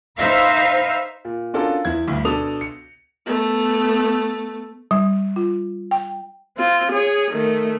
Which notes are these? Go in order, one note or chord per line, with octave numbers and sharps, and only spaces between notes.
D#4 B4 C5 E5 F5
A#2
C#4 D4 F4 F#4 A4 A#4
E2 E4 G#6
D2 G2
B2 D4 A4 D#6 F7
C#7
A3 B3
G3
F4
G5
C4 F4
G#4 C#5
D#3 A3